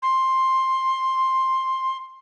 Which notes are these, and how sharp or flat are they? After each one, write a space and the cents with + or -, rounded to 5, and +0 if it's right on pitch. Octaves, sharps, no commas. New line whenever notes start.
C6 +10